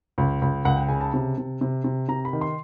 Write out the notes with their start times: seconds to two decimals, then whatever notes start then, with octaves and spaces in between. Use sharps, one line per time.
0.18 C#2
0.42 C#2
0.65 C#2 F#5
0.77 G5
0.89 C#3 G#5
1.01 A5
1.14 C3
1.38 C3
1.61 C3
1.84 C3
2.08 C3 A#5
2.25 B5
2.33 D#3
2.41 C6